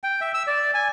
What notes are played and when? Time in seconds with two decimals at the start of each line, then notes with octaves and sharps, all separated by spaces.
0.04 G5
0.21 E5
0.34 E6
0.47 D5
0.74 G#5